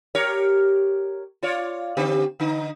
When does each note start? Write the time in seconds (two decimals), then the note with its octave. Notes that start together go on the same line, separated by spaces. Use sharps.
0.15 G4 A#4 C#5
1.43 F4 C#5 D5
1.97 D3 C4 G4
2.40 D3 D#4